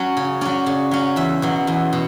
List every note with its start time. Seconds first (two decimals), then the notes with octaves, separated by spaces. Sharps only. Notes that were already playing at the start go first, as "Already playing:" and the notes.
Already playing: F#3 C#4
0.17 C#3
0.41 F#3 C#4 D5
0.66 C#3
0.91 F#3 C#4
1.16 E2 E5
1.42 B2 F#3
1.67 E2
1.93 B2